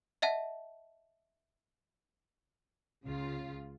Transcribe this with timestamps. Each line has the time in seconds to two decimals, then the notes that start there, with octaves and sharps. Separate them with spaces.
0.22 D#5 E5 F#5 A5
3.03 C#2 C#3 F4